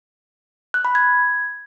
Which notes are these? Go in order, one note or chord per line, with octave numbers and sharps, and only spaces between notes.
F#6
B5
G#6